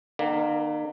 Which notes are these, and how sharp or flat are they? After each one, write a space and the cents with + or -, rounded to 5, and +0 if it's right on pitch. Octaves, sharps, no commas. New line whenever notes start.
D#3 -45 A#3 +15